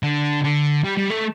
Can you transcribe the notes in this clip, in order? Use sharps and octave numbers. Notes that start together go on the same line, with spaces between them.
D3
D3
G3
G3
A3